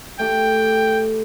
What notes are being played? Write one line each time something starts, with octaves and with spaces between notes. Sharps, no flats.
A3 G4 G5